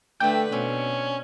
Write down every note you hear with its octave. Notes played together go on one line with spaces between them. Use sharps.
D3 A3 D4 B4 G5
B2 C4 C#4